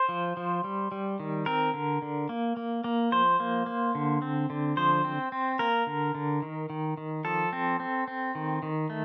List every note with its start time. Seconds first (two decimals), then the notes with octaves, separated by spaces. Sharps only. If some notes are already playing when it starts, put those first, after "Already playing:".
Already playing: C5
0.09 F3
0.37 F3
0.64 G3
0.92 G3
1.20 D#3
1.46 C4 A#4
1.74 D3
2.02 D3
2.29 A#3
2.57 A#3
2.84 A#3
3.12 F3 C5
3.40 A#3
3.66 A#3
3.95 D3
4.22 C4
4.50 D3
4.77 F3 C5
5.04 C4
5.32 C4
5.59 A#3 A#4
5.87 D3
6.15 D3
6.42 D#3
6.70 D#3
6.97 D#3
7.25 F3 A4
7.53 C4
7.80 C4
8.08 C4
8.35 D#3
8.63 D#3
8.90 A3